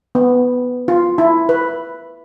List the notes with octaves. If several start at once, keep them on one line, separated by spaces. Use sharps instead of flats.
B3
F4
E4
B4